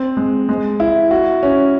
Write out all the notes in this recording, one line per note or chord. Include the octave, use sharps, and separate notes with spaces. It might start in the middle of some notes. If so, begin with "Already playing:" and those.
Already playing: C4
G#3
G#3
E4
F#4
C#4